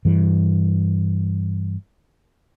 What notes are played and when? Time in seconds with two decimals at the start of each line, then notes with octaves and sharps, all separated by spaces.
0.05 G2 E3